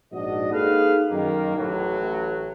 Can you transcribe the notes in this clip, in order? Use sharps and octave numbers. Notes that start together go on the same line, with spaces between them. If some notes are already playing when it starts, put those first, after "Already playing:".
A#1 G#2 D4 F#4 D#5
A#3 D#4 G#4 A4 B4 F5
F#2 D#3 A#3
A1 A2 F#3